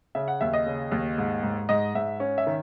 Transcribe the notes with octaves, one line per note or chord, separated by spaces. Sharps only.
C#3 E5
F#5
D#2 E5
D#5
C#3
D#2
G#2
G#2
G#2 D#5
G#2 E5
C#4
E5
D#3